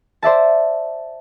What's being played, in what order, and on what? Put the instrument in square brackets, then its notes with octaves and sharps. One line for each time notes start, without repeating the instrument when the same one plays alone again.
[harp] C5 D5 E5 A5